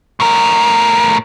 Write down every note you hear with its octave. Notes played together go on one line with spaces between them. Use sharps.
A2 A#4